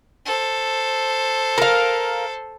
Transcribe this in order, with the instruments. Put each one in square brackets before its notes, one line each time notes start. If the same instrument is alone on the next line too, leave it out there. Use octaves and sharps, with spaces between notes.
[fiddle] A4 C5
[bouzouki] A#4 F5